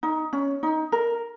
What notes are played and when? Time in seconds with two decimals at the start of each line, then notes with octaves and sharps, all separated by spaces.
0.03 D#4
0.33 C#4
0.63 D#4
0.92 A#4